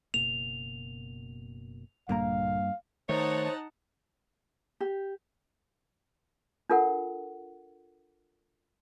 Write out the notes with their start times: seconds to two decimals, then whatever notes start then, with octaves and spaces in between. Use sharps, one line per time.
0.14 F#1 B2 A#3 F7
2.09 A#1 G2 A#2 D3 A#3 F5 A#5
3.09 D#3 A3 D#4 C5 C#5 F#5 A5
4.81 G4
6.70 D4 F4 A4 A#4 F#5